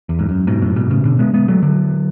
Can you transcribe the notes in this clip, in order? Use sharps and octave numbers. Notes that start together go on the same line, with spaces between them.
E2
G#2
F#2
G#2 B2
F#2 A2
G#2 B2
A2 C#3
B2 D3
G#3 B3
G#3 B3
F#3 A3
D3 F#3